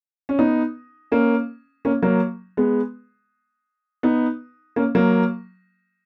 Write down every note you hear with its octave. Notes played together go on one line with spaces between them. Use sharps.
C#4
B3 D#4
A#3 C#4
A#3 C#4
F#3 A#3
G#3 B3
B3 D#4
A#3 C#4
F#3 A#3